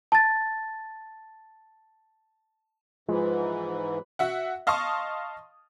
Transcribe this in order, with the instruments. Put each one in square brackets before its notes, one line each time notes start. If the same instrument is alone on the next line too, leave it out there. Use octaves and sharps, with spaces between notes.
[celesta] A5 A6
[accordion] G#2 E3 [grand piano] F3 [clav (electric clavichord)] G#3 [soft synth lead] B4
[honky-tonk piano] F#4 E5 F#5
D#5 F5 A5 C6 C#6 D#6